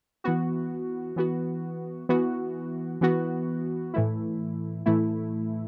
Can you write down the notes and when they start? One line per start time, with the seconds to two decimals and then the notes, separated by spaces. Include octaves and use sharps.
0.24 E3 B3 F#4
1.16 E3 B3 F#4
2.09 E3 B3 F#4
3.01 E3 B3 F#4
3.94 A2 E3 A3 E4
4.86 A2 E3 A3 E4